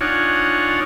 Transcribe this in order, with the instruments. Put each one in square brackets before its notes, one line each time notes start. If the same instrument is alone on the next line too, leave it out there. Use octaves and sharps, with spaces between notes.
[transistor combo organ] D4 D#4 F4 C#5 F#5 G#5